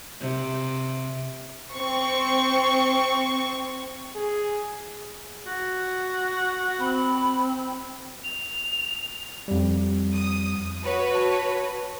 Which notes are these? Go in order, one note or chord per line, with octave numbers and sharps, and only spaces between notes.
C3
C4 C#6
G#4
F#4
C4 B5
F7
F2 G3
D#6
F#4 B4 C#5
A5